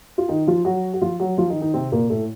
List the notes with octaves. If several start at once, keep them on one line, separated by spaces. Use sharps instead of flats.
F4
D#3 D#4
F3 F4
F#3 F#4
F#4
F3 F4
F#3 F#4
F3 F4
D#3 D#4
D#3 D#4
C3 C4
A#2 A#3
A2 A3